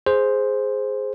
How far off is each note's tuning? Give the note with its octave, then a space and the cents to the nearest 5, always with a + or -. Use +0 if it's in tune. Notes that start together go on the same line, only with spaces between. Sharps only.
G#4 +0 C5 +0